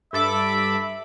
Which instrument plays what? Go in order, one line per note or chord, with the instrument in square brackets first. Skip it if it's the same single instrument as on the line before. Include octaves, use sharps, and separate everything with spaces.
[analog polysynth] G2 A4 D6 [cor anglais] E5 [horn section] B5